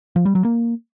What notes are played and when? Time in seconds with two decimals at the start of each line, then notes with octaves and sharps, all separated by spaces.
0.16 F3
0.25 G3
0.35 F#3
0.45 A#3